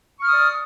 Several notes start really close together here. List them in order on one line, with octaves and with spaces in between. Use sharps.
C#6 F6 D#6 D5